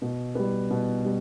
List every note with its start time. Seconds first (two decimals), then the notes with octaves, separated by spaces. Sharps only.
0.02 B2
0.35 G3 B3
0.70 B2
1.05 G3